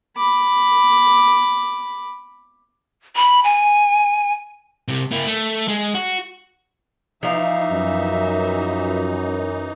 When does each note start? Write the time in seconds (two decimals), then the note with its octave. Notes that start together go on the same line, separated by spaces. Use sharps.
0.17 B5 D6
3.16 B5
3.44 G#5
4.88 C2 C3
5.11 A#3 E4
5.27 A3
5.68 G#3
5.94 F#4
7.23 E3 F3 D#4 E5 F5
7.71 F#2